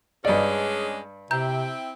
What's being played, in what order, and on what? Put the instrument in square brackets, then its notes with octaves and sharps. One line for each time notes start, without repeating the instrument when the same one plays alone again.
[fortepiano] G2 D5 [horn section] G#3 C#4 D4 [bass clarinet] G#4 [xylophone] D#5
[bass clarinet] C3 [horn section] C4 E4 G5 [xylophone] A#5 G6